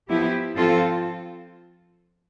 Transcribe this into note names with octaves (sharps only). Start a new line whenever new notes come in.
F3 B3 E4 G4
F3 C4 F4 A4